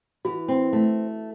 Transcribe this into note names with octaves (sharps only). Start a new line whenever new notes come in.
E3 F#4
C4
A3